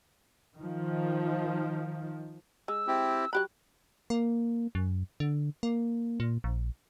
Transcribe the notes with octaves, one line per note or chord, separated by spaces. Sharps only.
D#3 F3
G#3 E6
C4 E4 G4
F#3 G4 B5 F#6
A#3
F#2
D3
A#3
A#2
A#1